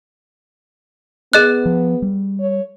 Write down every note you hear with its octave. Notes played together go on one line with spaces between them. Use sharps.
B3 G#4 D#5 F#6
F3
G3
C#5